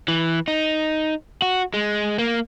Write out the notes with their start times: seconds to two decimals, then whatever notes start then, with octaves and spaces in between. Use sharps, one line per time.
0.08 E3
0.48 D#4
1.42 F#4
1.74 G#3
2.19 A#3